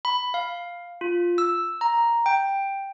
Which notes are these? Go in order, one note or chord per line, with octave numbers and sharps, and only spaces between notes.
B5
F5
F4
E6
A#5
G5